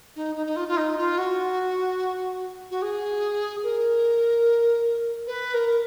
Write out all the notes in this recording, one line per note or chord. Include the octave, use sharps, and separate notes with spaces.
D#4
D#4
D#4
F4
F4
D#4
F4
F#4
F#4
G#4
A#4
B4
A#4